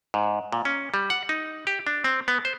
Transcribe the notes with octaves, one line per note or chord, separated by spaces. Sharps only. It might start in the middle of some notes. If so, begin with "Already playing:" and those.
G#2
A#2
C#4
G3
F#5
D#4
G4
D4
C4
B3
C5